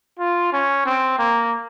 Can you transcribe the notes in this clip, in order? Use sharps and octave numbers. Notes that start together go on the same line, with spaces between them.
F4
C#4
C4
A#3